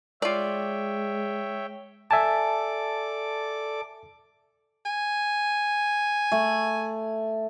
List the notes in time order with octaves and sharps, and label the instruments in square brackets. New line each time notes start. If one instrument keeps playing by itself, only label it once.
[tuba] G#3 [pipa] F4 D5 [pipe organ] C#5 E5 G5
[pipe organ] A4 D5 D6 [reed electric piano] E5 G#5 A5
[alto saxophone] G#5
[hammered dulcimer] A3